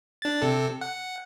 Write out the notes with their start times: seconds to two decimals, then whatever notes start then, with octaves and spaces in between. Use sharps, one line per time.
0.22 D4 A6
0.42 C3 A4
0.81 F#5